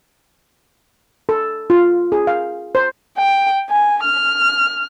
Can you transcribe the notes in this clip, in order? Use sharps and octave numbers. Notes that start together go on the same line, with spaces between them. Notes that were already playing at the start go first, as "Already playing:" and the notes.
A4
F4
G#4
F5
C5
G5
G#5
F6